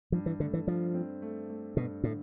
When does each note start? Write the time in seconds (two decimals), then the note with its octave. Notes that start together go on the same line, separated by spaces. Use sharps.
0.12 G2 F3
0.26 E3
0.39 D3 A3
0.53 E3
0.67 G2 F3
0.94 C4
1.22 A3
1.50 A3
1.76 G2 B2
2.04 A2 D3